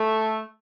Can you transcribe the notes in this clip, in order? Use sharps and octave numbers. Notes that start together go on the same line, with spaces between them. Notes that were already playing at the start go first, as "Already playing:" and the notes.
Already playing: A3